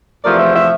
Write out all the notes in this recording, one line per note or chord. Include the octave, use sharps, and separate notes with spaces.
E2 C3 F3 A3 A#4 D5
C5 E5
C5 E5